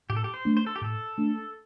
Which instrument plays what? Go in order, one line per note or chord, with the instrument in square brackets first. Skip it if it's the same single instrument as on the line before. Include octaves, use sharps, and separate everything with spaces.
[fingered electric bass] A2 [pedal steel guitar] G4
[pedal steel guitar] A4
G4
C5
[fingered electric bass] A3 D4
[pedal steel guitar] C5
A4
G4
[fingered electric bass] A2 [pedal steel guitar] A4
[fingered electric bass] A3 D4